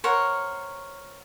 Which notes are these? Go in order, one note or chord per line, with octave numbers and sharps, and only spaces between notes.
A#4 C5 C#5 F#5